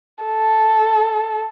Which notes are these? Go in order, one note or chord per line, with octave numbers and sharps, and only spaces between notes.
A4